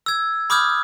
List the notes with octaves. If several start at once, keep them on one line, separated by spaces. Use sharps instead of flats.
E6 G#6
B5 D6 D#6 F6 G6 G#6